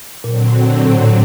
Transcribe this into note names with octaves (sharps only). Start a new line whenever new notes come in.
A#2 D3 F#3 C4
A2